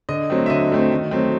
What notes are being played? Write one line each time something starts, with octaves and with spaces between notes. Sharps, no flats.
D3 D#5
F#3 A3 C4
E5
D3 D#5
F#3 A3 C4
D#3
F#3 A3 C4